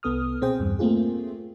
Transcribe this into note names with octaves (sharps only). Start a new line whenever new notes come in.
C2 B3 A4 D#6 F6
B2 C4 G#4 C5 G5
E2 G2
A3 A#3 C4 F4 G#4